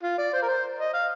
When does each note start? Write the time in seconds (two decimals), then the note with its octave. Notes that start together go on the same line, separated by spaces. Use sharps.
0.03 F4
0.18 D5
0.33 C5
0.42 A#4
0.48 C5
0.79 D#5
0.93 F5